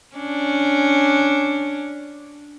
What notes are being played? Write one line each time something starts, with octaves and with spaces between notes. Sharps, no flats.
C#4 D4